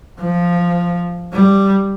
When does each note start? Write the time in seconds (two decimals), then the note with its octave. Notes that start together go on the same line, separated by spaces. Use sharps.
0.20 F3
1.33 G3